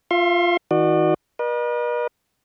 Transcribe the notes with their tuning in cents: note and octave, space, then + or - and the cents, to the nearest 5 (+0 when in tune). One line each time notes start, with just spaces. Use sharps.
F4 +0 E5 +40 C6 +30
D#3 +45 F#4 -5 D5 +40
B4 -45 D#5 -45